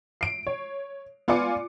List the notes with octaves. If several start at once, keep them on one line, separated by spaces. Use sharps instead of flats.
C7 D7
C#5
B3 F4 D5 G#5 D6 C#7